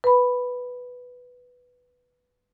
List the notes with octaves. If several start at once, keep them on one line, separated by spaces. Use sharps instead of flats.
B4 B5